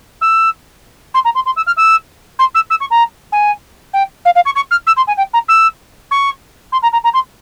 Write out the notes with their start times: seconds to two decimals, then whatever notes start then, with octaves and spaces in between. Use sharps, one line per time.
0.21 E6
1.14 C6
1.24 A#5
1.35 C6
1.45 C6
1.56 E6
1.66 F6
1.77 E6
2.39 C6
2.54 E6
2.70 E6
2.80 C#6
2.90 A#5
3.32 G#5
3.93 G5
4.25 F5
4.35 F5
4.45 C#6
4.55 C#6
4.71 F6
4.86 E6
4.96 C6
5.07 G#5
5.17 G5
5.33 A#5
5.48 E6
6.11 C#6
6.72 C6
6.82 A#5
6.92 A#5
7.04 A#5
7.13 C6